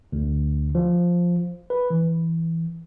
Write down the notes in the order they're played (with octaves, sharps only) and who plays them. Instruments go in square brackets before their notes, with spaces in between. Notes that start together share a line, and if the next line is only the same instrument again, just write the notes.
[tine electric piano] D2
F3
B4
E3